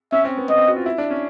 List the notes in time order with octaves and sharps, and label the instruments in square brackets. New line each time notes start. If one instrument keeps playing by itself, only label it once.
[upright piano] C#4 [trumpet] E5
[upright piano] C4
B3
[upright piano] B3 [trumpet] D#5
[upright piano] C4
F#4
F4
E4
D4
C#4